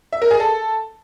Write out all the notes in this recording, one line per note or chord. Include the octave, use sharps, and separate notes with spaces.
E5
A#4
G#4
A4